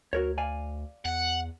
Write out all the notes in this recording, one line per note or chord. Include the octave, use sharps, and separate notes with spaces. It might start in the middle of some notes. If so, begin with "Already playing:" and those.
D2 F#4 A#4 C#5
D5 F5 G#5
E2 F#5